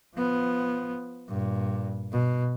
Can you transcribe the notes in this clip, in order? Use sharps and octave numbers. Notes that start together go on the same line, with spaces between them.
F3 B3
G2 A#2
B2